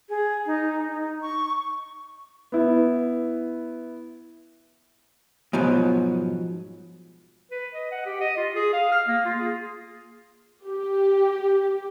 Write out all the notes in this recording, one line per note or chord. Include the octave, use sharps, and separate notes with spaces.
G#4
D#4
D#4
C#6
B3 E4
G#2 B2 F3 F#3
B4
D#5
F#5
G4
D#5
F4
G#4
F5
F6
A#3
F4
G#4
G4